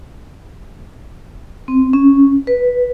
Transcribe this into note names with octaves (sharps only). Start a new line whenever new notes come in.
C4
C#4
B4